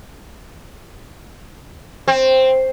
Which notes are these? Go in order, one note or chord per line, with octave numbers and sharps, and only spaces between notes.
C4